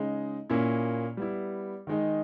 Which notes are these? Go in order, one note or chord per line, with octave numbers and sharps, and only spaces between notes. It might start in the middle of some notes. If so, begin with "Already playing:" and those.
Already playing: C#3 G#3 D#4
A#2 A#3 C#4 E4
G3 B3 E4
D#3 G#3 D#4